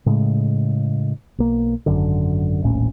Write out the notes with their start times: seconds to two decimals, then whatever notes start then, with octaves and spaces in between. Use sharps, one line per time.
0.06 A2 C#3 G#3
1.38 B1 A#3
1.86 G#1 F#2 D3
2.63 D#1 A#1 A2 C#4